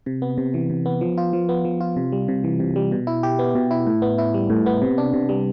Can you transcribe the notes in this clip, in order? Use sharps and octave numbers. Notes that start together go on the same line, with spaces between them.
C3
B3
C3
E3
C3
B3
F3
F4
F3
B3
F3
F4
C3
G3
C3
E3
C3
G3
B2
E4
G4
B3
B2
E4
A2
B3
E4
G3
A2
B3
C3
D4
C3
G3